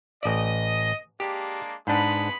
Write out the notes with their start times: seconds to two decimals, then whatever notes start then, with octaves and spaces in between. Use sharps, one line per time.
0.23 A1 D5 D#5
1.20 G#3 A#3 D4 G4
1.87 G#2 G#3 B3 D4 B5